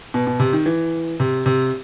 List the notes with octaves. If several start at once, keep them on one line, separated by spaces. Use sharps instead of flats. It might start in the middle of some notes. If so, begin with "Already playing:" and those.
B2
B2
C3
D#3
E3
C3
C3